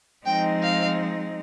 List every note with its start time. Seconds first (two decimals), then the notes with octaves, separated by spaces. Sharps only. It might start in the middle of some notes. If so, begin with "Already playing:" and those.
0.26 F3 G#3 C4 D#4 G5
0.62 F5